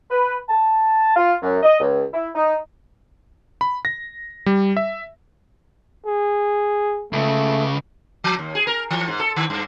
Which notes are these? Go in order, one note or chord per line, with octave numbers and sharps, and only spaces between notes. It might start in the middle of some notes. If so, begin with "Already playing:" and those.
B4
A5
F4
F#2
D#5
C#2
E4
D#4
B5
A#6
G3
E5
G#4
C#2 C#3 A3
F3
D#2
G#4
A#4
E3
G#2
A4
D#3
G2